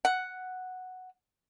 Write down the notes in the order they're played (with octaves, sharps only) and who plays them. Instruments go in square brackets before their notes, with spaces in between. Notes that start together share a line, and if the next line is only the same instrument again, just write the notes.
[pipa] F#5